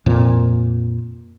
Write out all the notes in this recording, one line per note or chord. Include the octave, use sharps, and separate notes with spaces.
F2 A#2 F3